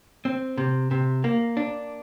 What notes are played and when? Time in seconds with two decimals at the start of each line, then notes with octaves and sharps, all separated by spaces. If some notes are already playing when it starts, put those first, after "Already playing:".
0.25 C4
0.57 C3
0.91 C3
1.24 A#3
1.57 D4